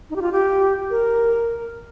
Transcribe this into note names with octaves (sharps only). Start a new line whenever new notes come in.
D#4
G4
F4
G4
A#4